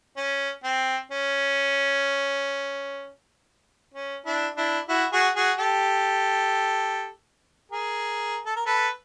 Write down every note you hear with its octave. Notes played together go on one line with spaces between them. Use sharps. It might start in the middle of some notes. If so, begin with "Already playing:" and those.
C#4
C4
C#4
C#4
D4 E4
D4 E4
E4 F#4
F#4 G#4
F#4 G#4
G4 A4
G#4 A#4
A4
A#4
A4 B4